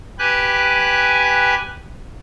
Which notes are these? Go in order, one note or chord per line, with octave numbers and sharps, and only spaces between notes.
G4 B4 G#5 F#6